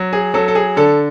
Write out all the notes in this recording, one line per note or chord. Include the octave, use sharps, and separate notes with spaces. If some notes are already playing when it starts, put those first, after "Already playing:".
Already playing: F#3
G#4
F#3 A4
A4
G#4
D3 A4